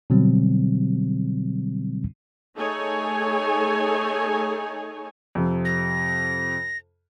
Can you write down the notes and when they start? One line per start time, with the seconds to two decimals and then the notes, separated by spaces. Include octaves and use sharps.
0.10 B2 D3 F#3 G3 C4
2.55 A3 D#4 G#4 A4 C#5 G#5
5.35 F2 C3
5.65 A#6